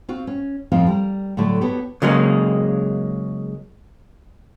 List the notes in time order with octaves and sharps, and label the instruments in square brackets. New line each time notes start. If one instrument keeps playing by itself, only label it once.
[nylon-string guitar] C4 F4 F#4
C#4
F2 A2 F3 C4 D#4 F5
G3 A#4
A2 D3 F#3 A3 D5
B3 F#4 G4 A4 C#5
[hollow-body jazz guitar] C#3 F#3 G#3 A#3